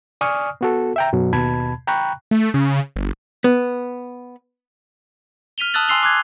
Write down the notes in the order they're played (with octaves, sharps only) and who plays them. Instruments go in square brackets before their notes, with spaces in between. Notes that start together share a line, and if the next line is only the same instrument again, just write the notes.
[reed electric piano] D5 G#5 C#6 D#6 F6
B3 F#4 A4
E5 G5 A#5
F#2 B2 F#3
D#2 B2 A5 B5 G#6
G5 A#5 B5 C#6 F#6
[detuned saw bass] A3
C#3
G1
[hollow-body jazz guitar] B3
[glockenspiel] F6 B6 D#7 F7 G7
A5 D#6 E6 F#6 A6 F#7
G#5 C6 E6 C7 F7 G7
D6 F#6 G#6